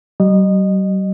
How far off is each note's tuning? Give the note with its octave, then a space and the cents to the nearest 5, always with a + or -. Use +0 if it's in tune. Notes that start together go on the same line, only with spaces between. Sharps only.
G3 -45 D#5 -20